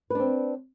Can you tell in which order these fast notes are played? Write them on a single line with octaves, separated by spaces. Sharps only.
B4 D4 C4